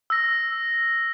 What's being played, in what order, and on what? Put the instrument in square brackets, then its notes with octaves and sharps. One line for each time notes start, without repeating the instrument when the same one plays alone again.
[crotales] E6 A#6